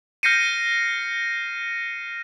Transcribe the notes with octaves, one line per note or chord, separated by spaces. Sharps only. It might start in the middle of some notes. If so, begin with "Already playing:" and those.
F6 G6 A#6 C7 C#7 D#7